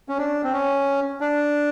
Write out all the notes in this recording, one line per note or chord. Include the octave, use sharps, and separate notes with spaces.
C#4
D4
C4
C#4
D4